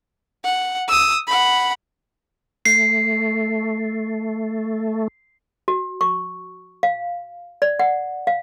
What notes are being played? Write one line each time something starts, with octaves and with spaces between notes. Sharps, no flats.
F#5
D#6 E6
F#5 B5
A3 C7
F#4
C#6
F5
D5
F#5
F5